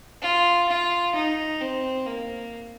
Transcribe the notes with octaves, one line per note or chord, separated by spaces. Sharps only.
F4
F4
D#4
C4
A#3